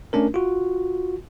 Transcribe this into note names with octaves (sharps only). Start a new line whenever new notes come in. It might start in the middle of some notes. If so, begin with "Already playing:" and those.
A3 C#4 D4 A#4
F4 F#4